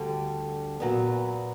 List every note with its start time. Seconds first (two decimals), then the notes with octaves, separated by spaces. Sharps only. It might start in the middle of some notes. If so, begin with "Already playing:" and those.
Already playing: D2 D3 G3
0.80 A#2 F#3 B3